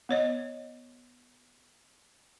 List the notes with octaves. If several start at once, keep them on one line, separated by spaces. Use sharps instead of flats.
B3 C#5 D#5